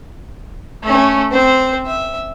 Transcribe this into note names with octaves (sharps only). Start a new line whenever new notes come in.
A3 C#4
C4 C5
E5